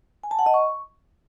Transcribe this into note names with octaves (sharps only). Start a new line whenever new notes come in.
G#5
A5
F#5
D#5
C#6